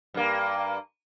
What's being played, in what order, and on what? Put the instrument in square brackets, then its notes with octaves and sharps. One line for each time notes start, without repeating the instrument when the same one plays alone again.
[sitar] G2 A#3